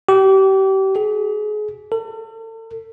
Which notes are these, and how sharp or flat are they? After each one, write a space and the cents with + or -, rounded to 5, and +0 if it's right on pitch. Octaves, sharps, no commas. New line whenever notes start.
G4 -30
G#4 +30
A4 +40